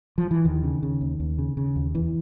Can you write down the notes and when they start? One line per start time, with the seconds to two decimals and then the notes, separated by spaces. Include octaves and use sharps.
0.18 F3
0.31 E3
0.44 D#2 D#3
0.63 C#3
0.83 C#3
1.01 D#2
1.20 D#2
1.38 C#3
1.57 C#3
1.76 D#2
1.95 E2 E3